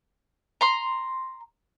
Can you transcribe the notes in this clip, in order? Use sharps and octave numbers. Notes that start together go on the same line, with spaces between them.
A#5 C6